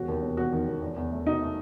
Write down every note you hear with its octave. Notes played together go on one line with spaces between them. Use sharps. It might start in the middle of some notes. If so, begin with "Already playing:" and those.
Already playing: E1 F#4
D#2
E1
E1 F#4
D#3
E1
E2
E2
A3
B2 D#4
A3